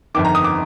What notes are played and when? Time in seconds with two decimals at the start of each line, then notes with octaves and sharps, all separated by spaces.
0.14 G1 F2 D#3 D6
0.25 A#5
0.35 D#6
0.44 D6